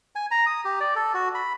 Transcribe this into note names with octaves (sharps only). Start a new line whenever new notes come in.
G#5
A#5
D#6
G4
D5
A4
F#4
B5